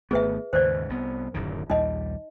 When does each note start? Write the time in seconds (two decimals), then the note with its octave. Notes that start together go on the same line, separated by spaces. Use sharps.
0.11 G#1 A3 B3 G#4 B4 E5
0.53 D#2 G#2 C#3 C5 D5
0.90 C2 B3
1.34 D1 F#2 D#3
1.70 A#1 D#2 G3 D#4 D#5